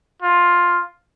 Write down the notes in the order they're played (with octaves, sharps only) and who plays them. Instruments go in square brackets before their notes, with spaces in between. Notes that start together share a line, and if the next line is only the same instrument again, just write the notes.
[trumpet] F4